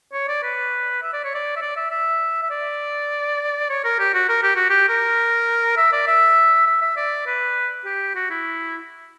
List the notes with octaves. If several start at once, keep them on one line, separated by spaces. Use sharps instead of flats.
C#5
D5
B4
E5
D5
C#5
D5
E5
D5
E5
E5
E5
D5
C#5
A#4
G4
F#4
A#4
G4
F#4
G4
A#4
E5
D5
E5
E5
E5
D5
B4
G4
F#4
E4